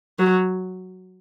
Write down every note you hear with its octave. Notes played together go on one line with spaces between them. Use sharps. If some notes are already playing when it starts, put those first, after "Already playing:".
F#3